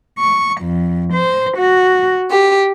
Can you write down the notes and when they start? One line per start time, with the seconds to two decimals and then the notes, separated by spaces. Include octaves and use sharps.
0.18 C#6
0.61 F2
1.13 C5
1.58 F#4
2.30 G4